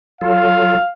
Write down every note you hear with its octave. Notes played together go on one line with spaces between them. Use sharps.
F#3 F4 A4 F5